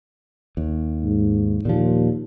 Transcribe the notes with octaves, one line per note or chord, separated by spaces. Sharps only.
D#2
G#2
D#2 A#2 F3